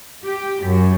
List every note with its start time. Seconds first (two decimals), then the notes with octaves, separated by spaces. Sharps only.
0.24 G4
0.65 F#2